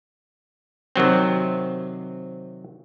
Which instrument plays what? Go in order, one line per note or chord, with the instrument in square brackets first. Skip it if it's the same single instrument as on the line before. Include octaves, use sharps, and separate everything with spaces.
[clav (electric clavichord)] C3 D#3 F#3 C4